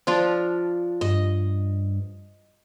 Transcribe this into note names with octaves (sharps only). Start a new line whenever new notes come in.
F3 D4 F4
G2 D#5